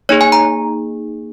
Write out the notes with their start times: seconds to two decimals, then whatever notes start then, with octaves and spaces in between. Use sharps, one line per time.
0.09 A#3 D#4 G#4 C#5
0.21 G#5
0.32 A#5